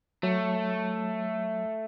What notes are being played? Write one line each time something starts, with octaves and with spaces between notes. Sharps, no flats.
F#3 A3 C#5